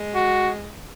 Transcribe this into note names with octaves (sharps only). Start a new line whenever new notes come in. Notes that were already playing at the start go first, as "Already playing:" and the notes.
Already playing: G#3
F#4